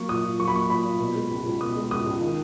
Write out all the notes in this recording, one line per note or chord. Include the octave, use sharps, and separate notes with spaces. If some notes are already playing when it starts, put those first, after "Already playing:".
Already playing: F#3 A#3 C#6
A#2 D#6
A#2
F#3 C#6
B5
A#3 C#6
A#2 B5
A#2
B2
G#3
C#2
C#2
B2 D#6
G#3
C#2 D#6
C#2
D#3